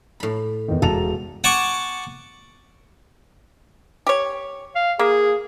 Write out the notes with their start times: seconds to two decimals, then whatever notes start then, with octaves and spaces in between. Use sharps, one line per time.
0.20 A2 B5
0.68 E2 D#3
0.82 E1 A4 A5 A#5 F7
1.44 F#5 G#5 A5 C#6 D6
4.07 G4 C#5
4.75 F5
4.99 A#3 G#4